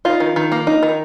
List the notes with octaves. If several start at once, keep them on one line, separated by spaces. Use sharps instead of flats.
D#4 F4
D#3
D#3
A#3
D#4
D#3